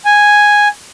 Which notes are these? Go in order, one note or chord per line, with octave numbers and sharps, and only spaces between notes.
G#5